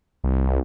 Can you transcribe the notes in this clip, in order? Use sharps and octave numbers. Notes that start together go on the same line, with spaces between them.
C2